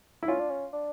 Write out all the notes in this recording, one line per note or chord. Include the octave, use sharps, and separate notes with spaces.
E4
C#4 F4
D4
C#4
D4